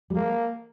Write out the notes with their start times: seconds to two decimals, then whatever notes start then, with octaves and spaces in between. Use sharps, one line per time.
0.10 G3
0.15 G#3 A#3